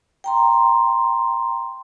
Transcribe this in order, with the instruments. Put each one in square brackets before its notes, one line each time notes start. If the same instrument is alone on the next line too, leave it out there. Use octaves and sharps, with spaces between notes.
[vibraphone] G5 A#5 C6